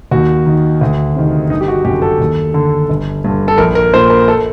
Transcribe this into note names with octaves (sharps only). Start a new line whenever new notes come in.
D#2 F#4
D#3
D2
C3 D#3
G1 D#4
G4
F#4
F#2 D3 G4
A4
D#2
D3
G1
G2 D3
A4
A#1 A#4
A#4
A#2 C5
A#4
A4